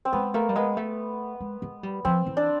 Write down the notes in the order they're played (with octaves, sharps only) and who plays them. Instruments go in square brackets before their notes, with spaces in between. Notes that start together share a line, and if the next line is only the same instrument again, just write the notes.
[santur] C4
[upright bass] G#3 [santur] B3
[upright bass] A3 [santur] A#3
[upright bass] G3
[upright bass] G#3 [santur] B3
[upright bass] A3
G#3
G#3
G3
[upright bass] F3 [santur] C4
[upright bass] E3
[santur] D4